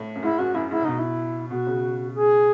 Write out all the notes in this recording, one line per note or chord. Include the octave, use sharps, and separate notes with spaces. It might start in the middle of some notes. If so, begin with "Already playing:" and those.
Already playing: A2
F#2
G#2 E4
F#2 F#4
F#2 E4
G#2 E4
C#3
B2 D#4
E4
B2 F#4
C#3
G#4